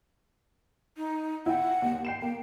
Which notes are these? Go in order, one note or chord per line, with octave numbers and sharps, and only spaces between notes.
D#4
E4 F#5 G5
D#2
G5 C7 E7
A#3 G5